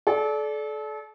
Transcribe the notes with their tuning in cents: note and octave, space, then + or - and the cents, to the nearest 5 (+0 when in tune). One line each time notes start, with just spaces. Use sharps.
A4 -35 D5 -10